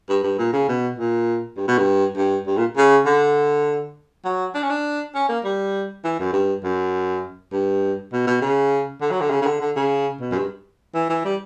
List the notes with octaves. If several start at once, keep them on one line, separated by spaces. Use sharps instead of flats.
G2
G2
A#2
C#3
B2
A#2
G2
B2
G2
G2
G2
A#2
C#3
D3
F#3
D4
C#4
D4
C#4
A#3
G3
E3
F#2
G2
F#2
G2
B2
B2
C#3
D3
F#3
D3
C#3
C#3
D3
D3
C#3
B2
F#2
G2
E3
E3
G3